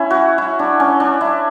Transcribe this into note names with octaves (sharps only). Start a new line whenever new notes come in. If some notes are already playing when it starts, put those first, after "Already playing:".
Already playing: C#4 E4
F#4
E4
D4
C#4
D4
E4